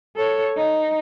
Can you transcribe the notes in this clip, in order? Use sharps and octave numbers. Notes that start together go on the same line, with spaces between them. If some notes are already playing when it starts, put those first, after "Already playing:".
A4 C#5
D#4